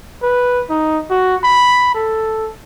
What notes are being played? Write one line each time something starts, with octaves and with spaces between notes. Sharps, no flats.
B4
D#4
F#4
B5
A4